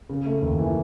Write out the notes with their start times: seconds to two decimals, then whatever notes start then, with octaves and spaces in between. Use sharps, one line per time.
0.09 C#3
0.26 A3
0.42 D#2
0.59 E3